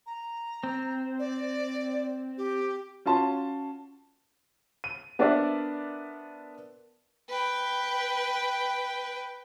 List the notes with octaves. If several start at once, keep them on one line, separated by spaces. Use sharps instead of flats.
A#5
C4
D5
G4
C#4 F4 F#4 A5 C6
D#7
B3 D4 A#4 C5 D5 E5
B4 G5